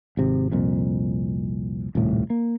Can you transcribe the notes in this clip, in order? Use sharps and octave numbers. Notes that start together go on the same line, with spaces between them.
G#1 C3
C2 F2 A#2
D#1 C2 A2
A#3